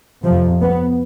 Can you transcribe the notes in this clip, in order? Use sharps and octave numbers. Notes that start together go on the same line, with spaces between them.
F2 C3 F3
B3